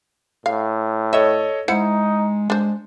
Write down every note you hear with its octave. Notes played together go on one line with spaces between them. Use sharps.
A2 F5
A4 C#5 D#5 E5
G#3 D#4 E4 C5 F#5 C#7
G#3 D4 C5